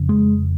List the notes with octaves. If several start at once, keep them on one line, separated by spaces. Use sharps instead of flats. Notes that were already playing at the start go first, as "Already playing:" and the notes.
Already playing: F1 F2 C#3
G#3